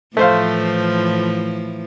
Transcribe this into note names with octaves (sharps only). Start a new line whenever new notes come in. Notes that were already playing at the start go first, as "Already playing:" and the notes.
A2 E3 F3 A3 C5 F5